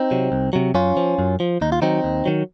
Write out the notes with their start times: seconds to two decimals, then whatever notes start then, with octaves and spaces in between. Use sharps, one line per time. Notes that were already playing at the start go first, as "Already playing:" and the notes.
Already playing: C4 D#4
0.11 C3 F#3
0.32 C2
0.53 C3 F#3
0.74 F#2 C#4 F4
0.97 F3
1.19 F#2
1.40 F3
1.61 D#2 D#4
1.72 F4
1.82 D#3 F#3 C4 D#4
2.04 D#2
2.25 D#3 F#3